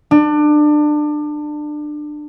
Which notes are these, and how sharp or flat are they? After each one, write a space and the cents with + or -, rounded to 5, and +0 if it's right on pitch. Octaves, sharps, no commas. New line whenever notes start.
D4 +25